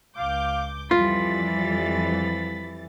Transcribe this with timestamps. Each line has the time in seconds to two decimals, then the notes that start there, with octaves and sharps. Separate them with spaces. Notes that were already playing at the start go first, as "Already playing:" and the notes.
0.18 C#2 F5 D6 G6
0.91 F2 E3 F3 G3 F4 B5 A6